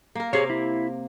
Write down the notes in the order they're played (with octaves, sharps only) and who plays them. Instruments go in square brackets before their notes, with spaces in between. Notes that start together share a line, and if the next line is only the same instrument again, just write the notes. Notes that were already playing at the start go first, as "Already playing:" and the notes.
[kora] A#3 A#4
[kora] C3 A#3 F5 [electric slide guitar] G#4 C#5
[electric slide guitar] E4